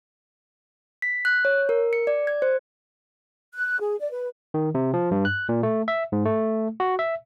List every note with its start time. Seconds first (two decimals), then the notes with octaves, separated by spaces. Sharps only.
1.02 B6
1.25 F#6
1.45 C#5
1.69 A#4
1.93 C#7
2.07 D5
2.27 G#6
2.42 C5
3.54 F#6
3.80 G#4
4.00 D5
4.12 B4
4.54 D#3
4.75 C3
4.94 F3
5.11 G2
5.25 F#6
5.49 A#2
5.63 A3
5.88 E5
6.12 G#2
6.26 A3
6.80 F#4
6.99 E5